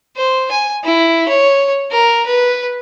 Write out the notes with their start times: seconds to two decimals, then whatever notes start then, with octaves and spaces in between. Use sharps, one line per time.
0.16 C5
0.51 G#5
0.84 E4
1.28 C#5
1.92 A#4
2.26 B4